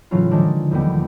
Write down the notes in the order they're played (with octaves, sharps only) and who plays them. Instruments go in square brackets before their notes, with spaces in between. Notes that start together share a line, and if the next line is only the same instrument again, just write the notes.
[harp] A2 C#3 E3 F#3 C#4 F4
D3 D#3 F3 G#3 D4
E1 D#2 D3 G3 B3 G5